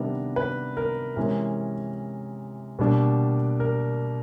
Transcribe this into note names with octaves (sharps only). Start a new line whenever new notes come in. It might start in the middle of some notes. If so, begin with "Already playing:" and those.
Already playing: C3 D#3 G3 B3 D4 A#4
B4
A#4
C3 E3 G#3 C#4 A#4
B2 G3 A#3 D4
A#4